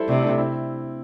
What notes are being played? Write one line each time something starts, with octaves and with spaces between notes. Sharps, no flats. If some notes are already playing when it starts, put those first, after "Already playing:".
Already playing: G3 E4 A4 C5
C3 A3 D4
A3 D4
C4 E4